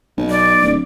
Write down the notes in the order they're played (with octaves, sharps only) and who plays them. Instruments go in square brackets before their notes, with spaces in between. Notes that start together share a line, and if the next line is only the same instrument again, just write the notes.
[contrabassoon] B1
[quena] D5
[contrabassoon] D1